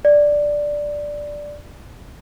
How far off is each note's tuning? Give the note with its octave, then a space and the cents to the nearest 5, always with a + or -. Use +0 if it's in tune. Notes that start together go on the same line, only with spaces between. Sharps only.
D5 +0